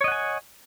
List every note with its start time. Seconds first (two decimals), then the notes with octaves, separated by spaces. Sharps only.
0.01 C#5
0.04 D#5
0.08 F#5
0.12 G#5